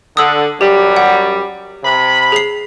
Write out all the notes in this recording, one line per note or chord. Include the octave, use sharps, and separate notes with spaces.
D3 D#6 E6
F#2 G3 G4
F#5
C3 B5
G#4 C7